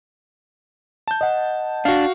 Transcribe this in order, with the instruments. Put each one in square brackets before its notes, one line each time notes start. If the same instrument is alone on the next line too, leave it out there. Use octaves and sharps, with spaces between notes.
[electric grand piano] A5 G6
[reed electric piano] D#5 F#5
[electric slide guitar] D4 [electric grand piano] F#4 F5